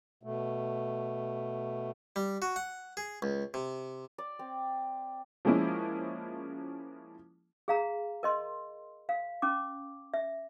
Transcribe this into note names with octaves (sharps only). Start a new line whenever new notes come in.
B2 A3
G3
F#4
F#5
G#4
C#2
C3
D5
C4
F3 G#3 A#3 C#4 E4
G#4 F5 A#5
A#4 D#5 C6
F5
C#4 D6
E5